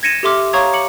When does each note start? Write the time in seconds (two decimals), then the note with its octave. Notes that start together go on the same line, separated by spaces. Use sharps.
0.03 G#6 A#6 C#7 D#7 E7
0.23 G4 A4 E5 C6 D6 F6
0.53 C#5 F5 A#5 C#6 D#6 G#6
0.73 D6 C#7 F#7